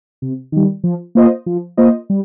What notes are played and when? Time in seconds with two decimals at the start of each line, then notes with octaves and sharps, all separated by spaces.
0.22 C3
0.52 D#3 G3
0.84 F3
1.15 A#3 F4 C5 D#5
1.46 F3
1.77 A#3 F4 C5 D#5
2.10 G3